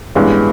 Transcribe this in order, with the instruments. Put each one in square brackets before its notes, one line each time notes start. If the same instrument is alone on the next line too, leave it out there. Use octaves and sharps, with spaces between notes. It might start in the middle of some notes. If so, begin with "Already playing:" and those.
[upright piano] A1 G2 E3 G#3 B3